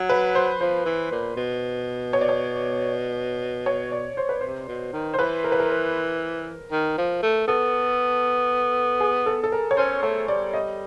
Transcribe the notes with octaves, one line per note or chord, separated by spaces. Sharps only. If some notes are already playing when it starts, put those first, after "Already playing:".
Already playing: F#3
B4
C5
F3 C5
E3
A#2
B2
C#5
D5
C#5
C#5
D5
C5
B4
C3 C5
B2
D#3
C5
E3 B4
A#4
B4
A#4
A#4
D#3
F3
A3
B3 A4
G#4
A4
A4
A#4
C#5
C#4 C5
A3 C#5
G3 D5
D#5